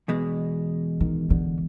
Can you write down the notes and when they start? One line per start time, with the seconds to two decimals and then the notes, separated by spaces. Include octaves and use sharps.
0.08 E2 B2 G#3
1.00 D#3
1.30 D3